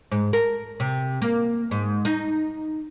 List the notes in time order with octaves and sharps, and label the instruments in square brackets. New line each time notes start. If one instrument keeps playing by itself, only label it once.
[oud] G#2
A#4
C3
A#3
G#2
D#4